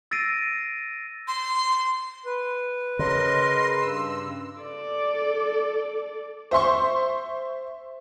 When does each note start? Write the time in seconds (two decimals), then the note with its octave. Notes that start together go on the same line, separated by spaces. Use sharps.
0.11 E6 A6 A#6 C7 D7 D#7
1.28 C6
2.26 B4
2.99 C#3 A#4 D#5 C6
3.81 G2 E6
4.62 A4 D5
6.51 C5 E5 C6 C#6